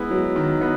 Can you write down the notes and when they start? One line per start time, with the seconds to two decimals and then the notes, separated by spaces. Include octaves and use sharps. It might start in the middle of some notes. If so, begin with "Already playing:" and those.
Already playing: G#3 B3 E4
0.11 F#3
0.36 D#3
0.61 B3